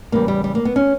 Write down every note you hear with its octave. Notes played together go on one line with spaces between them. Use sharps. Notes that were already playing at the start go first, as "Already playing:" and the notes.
E2 C#3 G3 A#3
G3
G3
A#3
B3
C#4